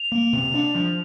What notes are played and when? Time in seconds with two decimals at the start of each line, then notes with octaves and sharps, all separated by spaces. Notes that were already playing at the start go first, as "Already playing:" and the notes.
Already playing: F7
0.12 A#3
0.33 C3
0.54 D4
0.75 F3